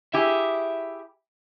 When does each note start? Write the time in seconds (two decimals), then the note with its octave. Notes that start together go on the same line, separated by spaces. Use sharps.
0.14 E4 G4 G#4 E5